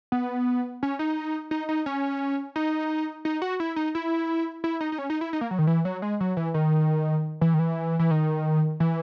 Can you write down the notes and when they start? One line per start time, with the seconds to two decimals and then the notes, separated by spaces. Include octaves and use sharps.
0.12 B3
0.83 C#4
0.99 D#4
1.51 D#4
1.69 D#4
1.86 C#4
2.56 D#4
3.25 D#4
3.42 F#4
3.60 E4
3.76 D#4
3.95 E4
4.64 E4
4.81 D#4
4.92 D#4
4.98 C#4
5.10 D#4
5.21 E4
5.33 D#4
5.41 A#3
5.51 F#3
5.59 D#3
5.67 E3
5.85 F#3
6.02 G#3
6.20 F#3
6.37 E3
6.54 D#3
7.41 E3
7.54 D#3
7.59 E3
7.99 E3
8.11 D#3
8.80 E3